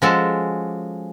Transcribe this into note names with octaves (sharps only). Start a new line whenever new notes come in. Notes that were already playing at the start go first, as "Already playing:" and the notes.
F3 G#3 C#4 F#4 A4